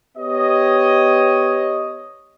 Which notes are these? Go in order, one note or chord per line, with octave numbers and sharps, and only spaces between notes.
B3 G4 C#5 D#5